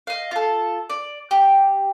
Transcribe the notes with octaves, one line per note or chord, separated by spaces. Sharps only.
D#5 F5
F4 A4
D5
G4